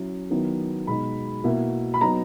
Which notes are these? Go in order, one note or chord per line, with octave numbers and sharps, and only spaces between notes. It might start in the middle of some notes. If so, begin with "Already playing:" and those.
Already playing: F#3 C#4 E4
D#3 F#3 B3 E4
B2 G#3 D#4 B5
B2 A#3 E4
B5
F#3 B3 D#4 A#5